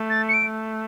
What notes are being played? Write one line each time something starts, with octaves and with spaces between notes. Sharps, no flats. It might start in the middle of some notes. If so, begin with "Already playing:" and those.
Already playing: A3
A6
C#7
D7
A3